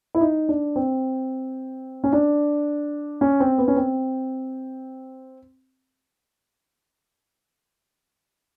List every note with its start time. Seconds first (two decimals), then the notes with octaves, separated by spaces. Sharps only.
0.15 E4
0.21 D#4
0.49 D4
0.76 C4
2.04 C#4
2.13 D4
3.21 C#4
3.40 C4
3.58 B3
3.68 C#4
3.76 C4